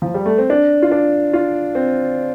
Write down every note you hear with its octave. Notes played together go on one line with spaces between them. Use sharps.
F3
G3
A3
C4
D4
F4
D4
F4
C4